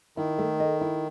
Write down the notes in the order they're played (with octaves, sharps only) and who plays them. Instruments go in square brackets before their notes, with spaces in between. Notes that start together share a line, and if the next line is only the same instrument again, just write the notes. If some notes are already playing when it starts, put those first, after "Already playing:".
[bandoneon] D#3 [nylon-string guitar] E4
[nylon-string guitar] A3
D#5
E4